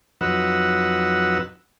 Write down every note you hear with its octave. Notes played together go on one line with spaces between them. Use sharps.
F2 F#3 D#4 B4 F#5 E6